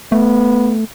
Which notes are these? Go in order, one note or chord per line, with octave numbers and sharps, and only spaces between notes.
A3 B3